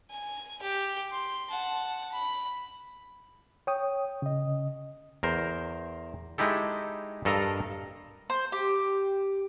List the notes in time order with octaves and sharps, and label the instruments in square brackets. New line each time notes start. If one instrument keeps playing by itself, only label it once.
[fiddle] G#5
G4
C6
F#5 A5
B5
[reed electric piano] C#5 G5 D#6
C#3 D#5
[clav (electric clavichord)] E2 A#4 C5
G#3 D#4 E4 G4 A4
G2 A4 A#4 D#5 F5 A#5
[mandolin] C5
G4